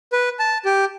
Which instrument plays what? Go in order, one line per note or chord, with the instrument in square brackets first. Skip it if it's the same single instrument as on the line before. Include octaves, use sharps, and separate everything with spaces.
[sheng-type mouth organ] B4
A5
G4